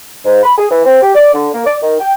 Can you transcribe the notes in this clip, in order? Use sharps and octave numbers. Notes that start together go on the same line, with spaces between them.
G#2
B5
G#4
E3
C4
G4
D5
D3
A#3
D5
D#3
G5